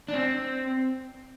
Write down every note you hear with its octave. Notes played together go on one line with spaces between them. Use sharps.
D4
C4